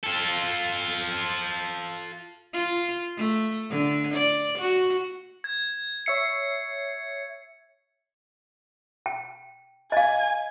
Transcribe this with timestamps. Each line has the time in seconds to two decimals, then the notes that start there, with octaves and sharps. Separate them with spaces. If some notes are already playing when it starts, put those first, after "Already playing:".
0.03 F4 A4
2.53 F4
3.17 A3
3.70 D3
4.14 D5
4.59 F#4
5.44 G#6
6.06 C#5 E5 C7 C#7
9.06 G5
9.92 D#5 F5 G#5